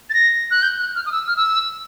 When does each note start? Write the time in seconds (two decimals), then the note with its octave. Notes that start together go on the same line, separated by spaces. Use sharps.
0.10 A6
0.14 A#6
0.51 F#6
0.63 G6
0.80 F#6
0.96 F6
1.06 D#6
1.12 E6
1.27 F6
1.37 E6